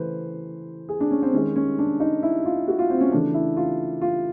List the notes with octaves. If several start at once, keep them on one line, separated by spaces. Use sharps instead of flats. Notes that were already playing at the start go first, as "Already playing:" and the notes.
Already playing: C#3 E3 A3 B4 C5
G#4
D4
C#4
C4
D#3 G#3 C#4
C#4
D4
D#4
E4
F4
F#4
F4
C4
C#4
C#3 E3 A3 D4
E4
F4
F4